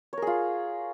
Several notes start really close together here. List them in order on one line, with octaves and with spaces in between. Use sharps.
C#5 A#4 G#4 F4